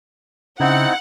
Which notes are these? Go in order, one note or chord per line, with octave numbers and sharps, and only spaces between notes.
C#3 C4 D#4 E4 F#5